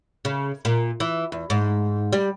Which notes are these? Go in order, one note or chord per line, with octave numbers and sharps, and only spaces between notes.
C#3
A#2
E3
E2
G#2
G3